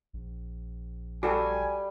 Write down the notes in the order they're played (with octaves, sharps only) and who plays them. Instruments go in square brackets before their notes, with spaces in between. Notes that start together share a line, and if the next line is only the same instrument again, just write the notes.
[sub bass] A#1
[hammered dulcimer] G3 G5 [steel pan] F#4 A4 [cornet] G#5